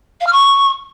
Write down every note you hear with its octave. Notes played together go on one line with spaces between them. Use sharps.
F5
F6
C#6